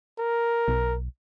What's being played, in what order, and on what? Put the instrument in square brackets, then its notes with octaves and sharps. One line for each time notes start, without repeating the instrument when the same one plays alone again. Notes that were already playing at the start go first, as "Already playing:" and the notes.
[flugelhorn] A#4
[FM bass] B1